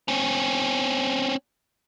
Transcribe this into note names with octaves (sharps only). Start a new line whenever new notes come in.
C4 C#4